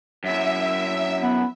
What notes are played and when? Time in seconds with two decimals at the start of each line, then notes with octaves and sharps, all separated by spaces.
0.24 F#2 E4 E5
1.22 B3